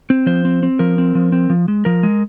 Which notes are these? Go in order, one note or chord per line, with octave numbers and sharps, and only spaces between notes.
C4
F3 C5
C4
C4
F3 A#4
C4
F3
C4
F3
G#3
F3 A#4
G#3